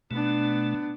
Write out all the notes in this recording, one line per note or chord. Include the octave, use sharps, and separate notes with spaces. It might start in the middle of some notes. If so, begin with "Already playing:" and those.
B2 A3 B3 D4